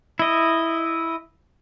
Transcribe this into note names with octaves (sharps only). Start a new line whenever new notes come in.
E4 D#5